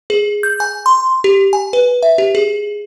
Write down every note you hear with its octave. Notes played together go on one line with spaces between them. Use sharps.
G#4
G6
G#5
C6
G4
G#5
B4
E5
G4
G#4